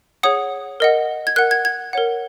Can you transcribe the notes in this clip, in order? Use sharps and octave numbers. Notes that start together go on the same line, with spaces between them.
G#4 C#5 F#5 D#6
A#4 D#5 F#5
G#6
A#4 F#5 F#6
G#6
G#6
A#4 C#5 F#5